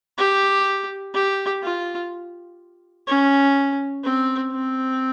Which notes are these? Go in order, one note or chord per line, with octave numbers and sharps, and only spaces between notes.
G4
G4
F4
C#4
C4
C4